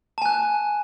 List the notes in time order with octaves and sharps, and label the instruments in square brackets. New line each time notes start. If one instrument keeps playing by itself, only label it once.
[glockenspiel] A5
G#5
F#6